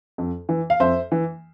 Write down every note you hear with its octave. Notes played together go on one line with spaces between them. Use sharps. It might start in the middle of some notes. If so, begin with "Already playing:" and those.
F2
E3
F5
F2 C5 E5
E3